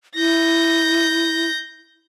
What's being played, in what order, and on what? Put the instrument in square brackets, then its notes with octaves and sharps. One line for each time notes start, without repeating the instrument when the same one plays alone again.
[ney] E4 [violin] G6 A#6